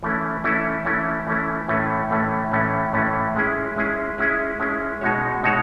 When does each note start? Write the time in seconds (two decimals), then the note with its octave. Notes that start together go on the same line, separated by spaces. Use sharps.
0.03 E3 A3 C#4 E4
0.44 E3 A3 C#4 E4
0.85 E3 A3 C#4 E4
1.27 E3 A3 C#4 E4
1.69 A2 E3 A3 C#4
2.10 A2 E3 A3 C#4
2.51 A2 E3 A3 C#4
2.93 A2 E3 A3 C#4
3.35 G#3 C#4 E4 G#4
3.76 G#3 C#4 E4 G#4
4.18 G#3 C#4 E4 G#4
4.59 G#3 C#4 E4 G#4
5.01 B2 G#3 D#4 F#4 C#5
5.43 B2 G#3 D#4 F#4 C#5